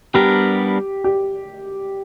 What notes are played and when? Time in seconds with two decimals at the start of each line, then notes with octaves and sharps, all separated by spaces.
0.14 G3 B3 D4 G4 A#4
1.04 G4